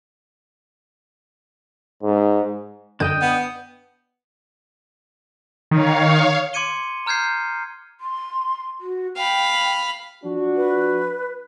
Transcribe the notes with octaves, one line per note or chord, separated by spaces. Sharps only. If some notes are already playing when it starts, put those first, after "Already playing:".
G#2
F#2 D3 D4 D#5 G5 G6
B3
D#3 C#5 F5
C6 D6 G#6 C#7 D#7 G7
A#5 F6 G6 G#6 C7
C6
F#4
F5 G5 B5
F3 D4 F#4
B4